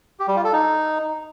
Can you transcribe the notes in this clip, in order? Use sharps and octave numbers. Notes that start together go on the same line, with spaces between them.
G4
G3
F4
A4
D#4